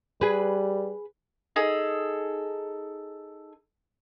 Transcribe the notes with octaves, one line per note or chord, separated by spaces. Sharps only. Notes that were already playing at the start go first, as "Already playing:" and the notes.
G3 G#4 B4
D#4 G#4 A4